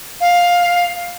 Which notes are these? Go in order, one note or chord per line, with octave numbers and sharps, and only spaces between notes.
F5